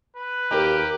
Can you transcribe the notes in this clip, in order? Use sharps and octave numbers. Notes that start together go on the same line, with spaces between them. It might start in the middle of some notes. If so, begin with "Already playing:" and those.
B4
D#2 G4 A#4